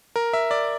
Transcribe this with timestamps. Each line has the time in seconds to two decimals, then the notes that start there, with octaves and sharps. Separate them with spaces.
0.16 A#4
0.33 E5
0.51 D5